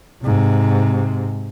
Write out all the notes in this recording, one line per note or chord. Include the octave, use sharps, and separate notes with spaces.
G#2 C3